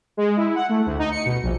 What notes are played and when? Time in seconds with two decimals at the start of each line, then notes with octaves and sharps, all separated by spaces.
0.17 G#3
0.37 E4
0.55 F#5
0.69 A3
0.86 D2
0.99 D#4
1.11 C#7
1.26 B2
1.43 A#1